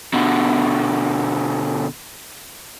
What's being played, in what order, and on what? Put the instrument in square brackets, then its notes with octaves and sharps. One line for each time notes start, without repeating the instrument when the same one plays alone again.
[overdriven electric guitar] B2 D3